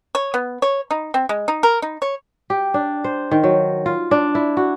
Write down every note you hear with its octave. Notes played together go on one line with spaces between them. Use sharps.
C#5
B3
C#5
D#4
C4
G#3
D#4
A#4
D#4
C#5
G4
D4
C5
D#3
F#3
F4
D4
E4
F#4